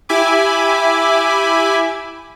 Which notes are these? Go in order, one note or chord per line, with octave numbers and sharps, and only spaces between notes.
E4 G4 E5 G#5 B5 D6